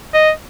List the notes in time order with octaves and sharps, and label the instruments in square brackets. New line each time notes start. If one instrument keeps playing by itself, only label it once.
[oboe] D#5